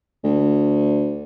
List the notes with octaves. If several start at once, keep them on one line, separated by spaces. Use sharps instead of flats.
D2